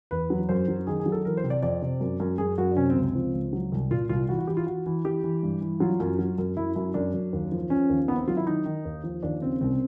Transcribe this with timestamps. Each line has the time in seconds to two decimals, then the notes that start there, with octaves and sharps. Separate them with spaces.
0.11 E2 B4
0.30 F#3
0.49 F#2 C5
0.68 F#3
0.87 D#3 G#4
1.00 G#4
1.06 F#3
1.12 A4
1.25 E3 A#4
1.37 C5
1.44 C3
1.50 D5
1.62 F2 D5
1.82 C3
2.01 F#2
2.20 F#2
2.38 F#2 G#4
2.58 F#2 F#4
2.71 D4
2.76 C3 C#4
2.90 C4
2.96 C#2
3.02 C4
3.15 F3
3.33 C#2
3.53 F#3
3.72 C2
3.90 A#2 F4
4.09 C2 F4
4.29 E3 F#4
4.39 F#4
4.47 E3 G4
4.57 F4
4.67 E3 F#4
4.86 E3
5.04 E3 G4
5.23 E3
5.43 G2
5.61 E3
5.80 F#3 F4
6.00 F#2
6.19 F#3
6.38 F#2
6.57 F#2 E4
6.75 F#2 E4
6.94 F#2 D4
7.14 F#2
7.33 D#2
7.52 F3
7.70 F3 C#4
7.89 D#2
8.08 D#3 B3
8.18 C4
8.28 F#3 F4
8.37 E4
8.47 D#3 D#4
8.66 D#3
8.85 D#2
9.04 F3
9.23 D#2 D4
9.42 C#3 C4
9.61 C2 C4